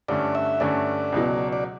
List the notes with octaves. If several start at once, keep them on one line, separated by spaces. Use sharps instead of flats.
G2 D3 A3 C#4 D5
E5
G2 D3 A3 C#4 D5
C#2 B2 F#3
D5